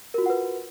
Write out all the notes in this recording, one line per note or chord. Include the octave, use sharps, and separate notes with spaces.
F4 F#4 A#4 B4 F#5